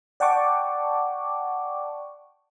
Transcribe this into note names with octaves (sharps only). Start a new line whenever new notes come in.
D5 F#5 G5 A5 C#6 D6